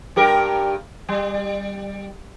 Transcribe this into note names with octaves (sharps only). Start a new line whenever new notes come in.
G2 G4 A#4
G3